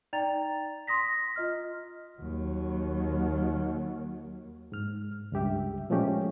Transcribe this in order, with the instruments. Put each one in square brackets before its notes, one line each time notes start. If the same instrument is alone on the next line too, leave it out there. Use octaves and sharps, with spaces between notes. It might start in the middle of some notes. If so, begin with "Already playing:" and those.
[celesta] D#4 D5 G5 A#5 A6 F7
C6 D#6 A#6 B6
F4 D#5 F6
[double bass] D#2 F#3
[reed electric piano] G#2 F6
C#2 G2 G4 E5
A#2 F3 G#3 A3 C#4 G4